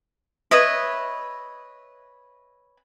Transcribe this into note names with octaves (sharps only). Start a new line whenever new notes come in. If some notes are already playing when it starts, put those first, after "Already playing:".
B4 C#5 D#5 E5